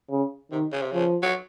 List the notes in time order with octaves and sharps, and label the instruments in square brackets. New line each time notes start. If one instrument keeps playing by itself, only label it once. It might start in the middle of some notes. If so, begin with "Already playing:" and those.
[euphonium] C#3
[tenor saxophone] C3 [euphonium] D#3
[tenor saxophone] C#3
C3
[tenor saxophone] C#3 [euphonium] F3
[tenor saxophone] F#3